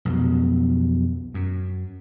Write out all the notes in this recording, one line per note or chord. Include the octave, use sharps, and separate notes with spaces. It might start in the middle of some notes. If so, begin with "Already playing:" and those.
B1 F2 B2 B3
F#2